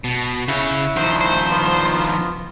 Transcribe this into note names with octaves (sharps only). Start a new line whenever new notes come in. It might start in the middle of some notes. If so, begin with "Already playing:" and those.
B2 A5
C#3 E4 C#5 F#5
D#3 F3 C5
C5
B3 F4